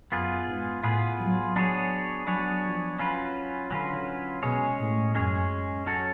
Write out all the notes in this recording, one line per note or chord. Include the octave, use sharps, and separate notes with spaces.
F#2 B3 F4 G#4 B4
G#2
A2 B3 F4 G#4 B4
F#3
F#3 B3 D4 G#4 C#5
F#3 B3 D4 G#4 C#5
F3
F#3 C#4 F4 B4
D3 F#3 C#4 F4 B4
B2 G#3 C#4 G#4 C#5
A2
F#2 G#3 C#4 G#4 C#5
F#3 C#4 F#4 A4 C#5